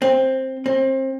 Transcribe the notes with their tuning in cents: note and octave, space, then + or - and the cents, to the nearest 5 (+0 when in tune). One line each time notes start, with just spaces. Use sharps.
C4 +10
C4 +30